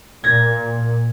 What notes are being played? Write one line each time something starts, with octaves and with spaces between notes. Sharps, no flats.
A#2 G#6 A#6